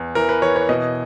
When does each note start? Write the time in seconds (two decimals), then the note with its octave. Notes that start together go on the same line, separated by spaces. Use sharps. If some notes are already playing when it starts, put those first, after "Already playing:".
Already playing: E2
0.15 E3 A#4
0.29 B4
0.42 E3 C#5
0.56 C#5
0.69 B2 D#5